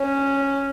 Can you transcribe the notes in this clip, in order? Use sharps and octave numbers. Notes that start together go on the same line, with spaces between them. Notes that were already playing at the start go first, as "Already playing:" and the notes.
Already playing: C#4